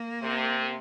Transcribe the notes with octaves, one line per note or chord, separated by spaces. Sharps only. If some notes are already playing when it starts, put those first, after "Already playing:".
Already playing: A#3
C3